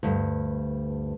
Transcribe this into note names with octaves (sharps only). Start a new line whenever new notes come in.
D2 G2